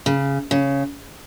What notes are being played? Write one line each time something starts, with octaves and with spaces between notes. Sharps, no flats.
C#3
C#3